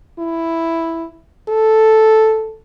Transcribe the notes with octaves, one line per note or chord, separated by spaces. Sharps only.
E4
A4